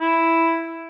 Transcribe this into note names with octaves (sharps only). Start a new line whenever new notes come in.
E4